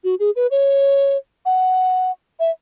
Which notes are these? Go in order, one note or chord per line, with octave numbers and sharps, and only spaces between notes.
F#4
G#4
B4
C#5
F#5
E5